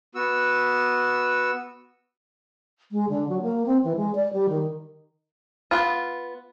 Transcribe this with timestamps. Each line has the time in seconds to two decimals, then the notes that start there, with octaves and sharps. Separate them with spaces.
0.15 B3 F#4 E6
2.91 G#3
3.09 D3
3.29 F#3
3.42 A#3
3.66 C4
3.84 E3
3.96 G#3
4.15 D5
4.33 G3
4.49 D#3
5.71 B3 F4